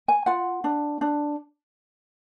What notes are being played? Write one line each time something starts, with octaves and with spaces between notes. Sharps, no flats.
G#5
F4 F#5
D4
D4